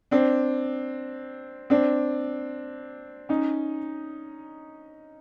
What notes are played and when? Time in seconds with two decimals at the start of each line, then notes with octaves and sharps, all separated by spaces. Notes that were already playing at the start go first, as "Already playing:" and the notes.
0.11 C4 D4
1.70 C4 D4
3.29 C#4 D#4